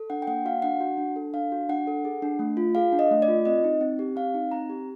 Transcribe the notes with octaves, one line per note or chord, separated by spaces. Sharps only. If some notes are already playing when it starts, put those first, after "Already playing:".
Already playing: A4
D4 F#5
G5
A#3 F#5
F#4 F5
D4 F#5
F#4
D4
A4
D4 F5
F#4
D4 F#5
A4
G#4
D4
A3
F4
G#4 F5
D4
D#5
A3
D5
F4
C4 D#5
D#4
C4
G4
C4 F5
D#4
C4 A#5
G4